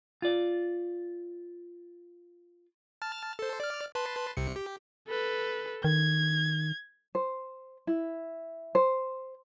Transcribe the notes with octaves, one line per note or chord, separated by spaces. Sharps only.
F4 D5
A5 F6 A6
A4 C5
D5 F6
B4 A5 C6
C2 C3 C#7
G4
A4 B4
D#3 G#6
C5
E4
C5